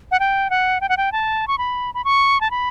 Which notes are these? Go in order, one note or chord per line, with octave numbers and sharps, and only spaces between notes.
F#5
G5
F#5
G5
F#5
G5
A5
C#6
B5
B5
C#6
A5
B5